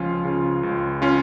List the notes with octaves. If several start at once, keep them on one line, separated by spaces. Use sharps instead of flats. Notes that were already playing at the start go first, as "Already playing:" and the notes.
Already playing: C#2 F3 C#4 F4
C#3
C#2
C#4 F4